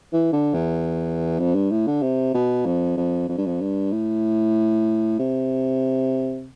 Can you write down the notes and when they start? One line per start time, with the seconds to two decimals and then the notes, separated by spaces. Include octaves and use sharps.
0.13 E3
0.33 D3
0.54 E2
1.39 F2
1.54 G2
1.71 A2
1.87 D3
2.02 C3
2.35 B2
2.65 F2
2.97 F2
3.29 F2
3.38 G2
3.46 F2
3.61 G2
3.92 A2
5.19 C3